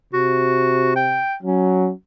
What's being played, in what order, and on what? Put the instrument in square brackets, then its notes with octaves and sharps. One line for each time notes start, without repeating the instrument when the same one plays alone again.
[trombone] C3 [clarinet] F#4
[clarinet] G5
[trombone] F#3 [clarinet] C#4